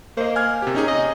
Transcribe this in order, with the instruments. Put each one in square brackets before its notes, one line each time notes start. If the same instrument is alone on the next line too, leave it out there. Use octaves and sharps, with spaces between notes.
[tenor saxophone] A#3 [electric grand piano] C5 D#5
[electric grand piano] G#5 F6 G#6
C3 G4
C#4 D#4 G#4
[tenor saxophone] D#5